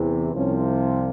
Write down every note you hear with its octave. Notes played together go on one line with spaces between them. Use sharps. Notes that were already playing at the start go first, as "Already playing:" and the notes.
Already playing: E2 C3 E3
C2 C3 F3 C#4